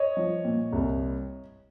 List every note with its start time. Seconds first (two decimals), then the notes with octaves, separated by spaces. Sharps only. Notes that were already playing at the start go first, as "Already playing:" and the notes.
Already playing: C#5 D#5
0.17 F3
0.45 A#2
0.72 C2